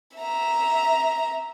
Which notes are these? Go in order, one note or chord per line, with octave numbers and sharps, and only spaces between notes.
E5 A#5